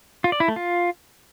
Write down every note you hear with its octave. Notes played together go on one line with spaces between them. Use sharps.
F4
D5
E4
A3
F4